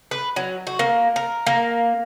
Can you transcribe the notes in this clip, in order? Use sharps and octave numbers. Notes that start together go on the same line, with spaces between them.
B4
F#3
F#4
A#3
A#4
A#3